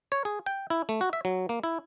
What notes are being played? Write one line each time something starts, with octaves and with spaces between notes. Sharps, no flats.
C#5
G#4
G5
E4
A3
F#4
E5
F#3
A#3
E4